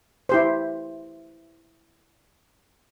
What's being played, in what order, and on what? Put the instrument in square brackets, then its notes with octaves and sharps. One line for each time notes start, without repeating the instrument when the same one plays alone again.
[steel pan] E4 G4 C5